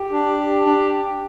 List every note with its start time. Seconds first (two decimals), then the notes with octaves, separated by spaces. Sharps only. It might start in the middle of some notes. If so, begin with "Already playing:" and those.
Already playing: G4
0.11 D4
0.39 G4
0.66 D4